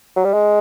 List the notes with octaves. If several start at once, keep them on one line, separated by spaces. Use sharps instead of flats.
F#3
G3
G#3